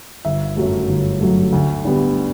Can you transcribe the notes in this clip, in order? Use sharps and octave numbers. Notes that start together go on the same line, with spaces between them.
G1 E5
F#2 F#3 A3
G1
F#2 F#3 A3
D2
D3 G3 B3